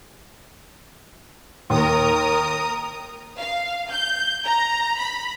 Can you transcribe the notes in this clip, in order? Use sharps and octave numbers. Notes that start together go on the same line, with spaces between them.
D#2 A#4 A#5 D#6
F5
G6
A#5
B5